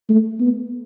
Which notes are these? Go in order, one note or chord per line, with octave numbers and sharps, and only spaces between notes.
A3
B3